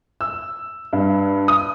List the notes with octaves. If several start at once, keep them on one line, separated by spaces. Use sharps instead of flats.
E6
G2
D#6